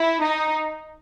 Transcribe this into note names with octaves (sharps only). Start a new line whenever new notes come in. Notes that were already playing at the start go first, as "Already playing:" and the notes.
Already playing: E4
D#4